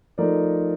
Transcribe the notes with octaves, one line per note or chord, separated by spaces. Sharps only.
F3 A3 D#4 A#4 D5